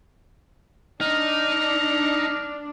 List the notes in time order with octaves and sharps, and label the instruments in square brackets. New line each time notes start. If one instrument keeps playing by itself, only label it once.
[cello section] D4 [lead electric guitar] D#4 [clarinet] F6